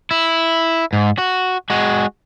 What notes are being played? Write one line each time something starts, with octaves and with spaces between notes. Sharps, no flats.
E4
G#2
F#4
G#3 F#4